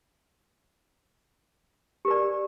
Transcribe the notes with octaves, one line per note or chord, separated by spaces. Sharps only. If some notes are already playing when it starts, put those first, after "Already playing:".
G4 A#4 D5